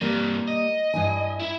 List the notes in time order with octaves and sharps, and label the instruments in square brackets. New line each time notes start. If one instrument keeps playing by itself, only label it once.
[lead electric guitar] G2 C3 [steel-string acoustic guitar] G3 A#3
[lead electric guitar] D#5
[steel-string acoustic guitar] G2 E4 G#5
[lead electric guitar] E4